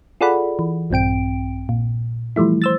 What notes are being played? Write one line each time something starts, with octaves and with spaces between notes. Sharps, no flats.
F4 G#4 A4 D5 F#5 B5
E3
A#1 G2 C4 G5 D7
A#2
E3 F3 G3 A3 E4
C5 E6 A6